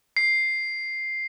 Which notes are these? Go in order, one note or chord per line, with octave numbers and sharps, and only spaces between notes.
C7